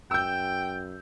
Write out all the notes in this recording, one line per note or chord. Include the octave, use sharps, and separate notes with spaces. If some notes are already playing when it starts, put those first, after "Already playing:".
F#2 G5 E6 G6